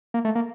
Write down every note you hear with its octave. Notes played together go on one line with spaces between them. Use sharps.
A#3
A3
A#3